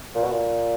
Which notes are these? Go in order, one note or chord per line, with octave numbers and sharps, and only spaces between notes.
A#2
B2
A#2